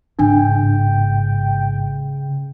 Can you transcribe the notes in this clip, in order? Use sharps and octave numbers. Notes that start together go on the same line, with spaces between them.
A1 G#2 C#3 D4 G5